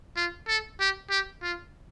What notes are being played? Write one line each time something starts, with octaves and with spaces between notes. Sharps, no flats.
F4
A4
G4
G4
F4